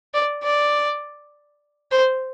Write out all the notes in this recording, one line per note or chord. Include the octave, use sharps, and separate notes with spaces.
D5
D5
C5